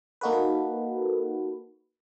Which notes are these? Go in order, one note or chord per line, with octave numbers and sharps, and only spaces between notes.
A#3 D#4 F#4 A4 B4